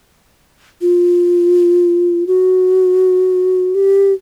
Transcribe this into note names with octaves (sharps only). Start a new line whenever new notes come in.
F4
F#4
G4